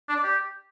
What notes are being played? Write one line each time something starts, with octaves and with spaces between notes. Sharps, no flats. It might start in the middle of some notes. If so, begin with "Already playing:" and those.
D4
D5
G4